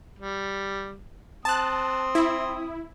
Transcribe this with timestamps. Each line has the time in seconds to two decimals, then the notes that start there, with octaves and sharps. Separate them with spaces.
0.19 G3
1.45 C4 A5 D#6 F#6
2.15 E4